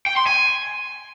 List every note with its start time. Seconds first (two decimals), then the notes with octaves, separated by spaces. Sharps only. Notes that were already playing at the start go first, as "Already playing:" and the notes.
0.06 G5
0.17 C6
0.27 G#5